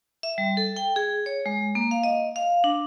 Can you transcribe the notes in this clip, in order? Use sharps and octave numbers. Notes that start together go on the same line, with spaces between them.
E5
G3
A4
G5
G#4
C#5
G#3
A#3
F5
D#5
F5
D4